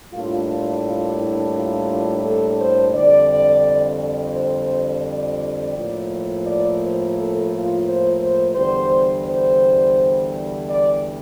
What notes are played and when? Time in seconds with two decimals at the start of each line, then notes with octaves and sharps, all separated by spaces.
0.13 A2 G3 A#3 D4 F4
0.48 F4
0.83 F4
1.18 E4
1.53 F4
2.23 A4
2.58 C5
2.93 F2 D3 G3 D5
4.34 C5
5.03 D5
5.74 A2 F3 A#3
6.44 D5
6.79 C5
7.14 A4
7.50 F4
7.85 C5
8.20 C5
8.54 E2 D3 G3 C5
9.25 C5
10.66 D5